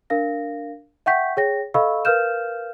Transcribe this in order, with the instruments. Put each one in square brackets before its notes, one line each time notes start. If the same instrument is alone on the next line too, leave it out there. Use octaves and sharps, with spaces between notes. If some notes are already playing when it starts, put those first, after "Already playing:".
[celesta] D4 A#4 F5 A#6
E5 F#5 G5 C#6 G6 B6
G#4 C#5 G5 A#6
A4 D#5 F5 B5 C#6 E6
A#4 B4 F5 F6 G6 E7